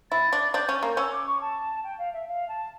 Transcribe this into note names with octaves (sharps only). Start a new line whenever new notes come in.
E4 A6
D4
D4 G6
C#4
G6
A#3
C#4 E6
D6
C#6
A5
G5
F5
E5
F5
A5